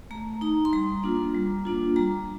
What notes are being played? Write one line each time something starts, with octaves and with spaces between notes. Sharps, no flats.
A3 A#5
D#4 A#5
C6
G3 A#5
A#3 D4 F4
G3
A#3 D4 F4
G3 A#5